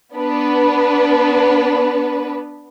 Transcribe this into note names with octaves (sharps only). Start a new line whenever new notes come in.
B3 D4 B4